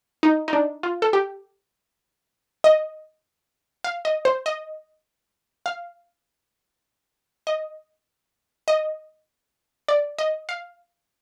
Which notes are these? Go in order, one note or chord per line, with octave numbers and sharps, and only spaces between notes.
D#4
D#4
D4
F4
A4
G4
D#5
F5
D#5
C5
D#5
F5
D#5
D#5
D5
D#5
F5